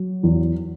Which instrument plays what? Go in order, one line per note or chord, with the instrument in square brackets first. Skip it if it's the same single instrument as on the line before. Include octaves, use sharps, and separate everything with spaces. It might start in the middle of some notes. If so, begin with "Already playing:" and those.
Already playing: [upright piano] F#3
E2